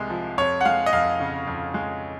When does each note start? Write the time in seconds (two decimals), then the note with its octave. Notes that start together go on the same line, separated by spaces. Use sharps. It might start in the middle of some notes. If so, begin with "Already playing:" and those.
Already playing: C2 C3 G#3
0.10 F3
0.38 F2 C#5
0.61 F#5
0.65 G#3 F5
0.86 D#5
0.93 F2 F5
1.20 C#3
1.47 F2
1.74 G#3